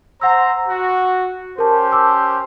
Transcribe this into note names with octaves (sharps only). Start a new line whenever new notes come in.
C5 F#5 A#5 E6
F#4
C#4 G4 A#4 C5 A5
A5 D6 E6